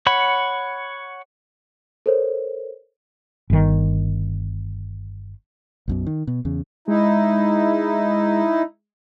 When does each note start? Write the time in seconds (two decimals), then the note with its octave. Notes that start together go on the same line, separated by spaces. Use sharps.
0.07 C#5 F#5 B5
2.06 A4 A#4 C5 C#5
3.50 G1 D#3
5.88 B1 F#2 B2
6.07 D#3
6.27 B2
6.45 E2 C#3
6.88 G#3 D#4 E4